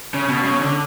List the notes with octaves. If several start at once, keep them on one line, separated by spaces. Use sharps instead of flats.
C#3
B2
C#3
D3